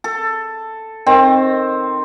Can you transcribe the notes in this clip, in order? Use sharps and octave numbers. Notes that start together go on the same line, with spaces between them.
A4
D#3 C4